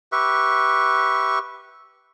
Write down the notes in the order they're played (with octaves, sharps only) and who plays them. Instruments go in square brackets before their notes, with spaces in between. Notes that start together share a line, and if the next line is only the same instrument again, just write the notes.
[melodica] G4 B4 E5 C#6